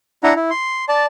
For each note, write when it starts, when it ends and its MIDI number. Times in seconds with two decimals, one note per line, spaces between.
0.24 0.34 62
0.24 0.34 64
0.24 0.34 78
0.24 0.34 82
0.36 0.50 64
0.50 0.85 84
0.89 1.06 74
0.89 1.06 81